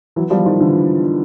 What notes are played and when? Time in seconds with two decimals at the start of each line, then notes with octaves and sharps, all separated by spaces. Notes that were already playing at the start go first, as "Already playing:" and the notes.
0.16 E3 F#3
0.30 F3 G3
0.46 D#3 F3
0.60 D3 E3